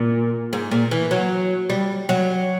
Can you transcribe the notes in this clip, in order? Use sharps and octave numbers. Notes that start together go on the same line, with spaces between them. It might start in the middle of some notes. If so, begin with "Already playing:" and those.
Already playing: A#2
G#2
A#2
E3
F#3
G3
F#3